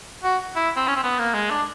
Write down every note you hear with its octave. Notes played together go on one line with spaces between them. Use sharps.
F#4
E4
C4
C#4
C4
B3
A#3
G#3
D4